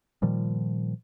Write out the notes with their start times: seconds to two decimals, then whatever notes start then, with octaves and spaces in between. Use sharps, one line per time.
0.22 A#2 D#3 F3 G3